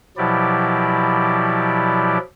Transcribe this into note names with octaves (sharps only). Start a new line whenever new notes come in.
B2 F3 F#3 E4 G4 D5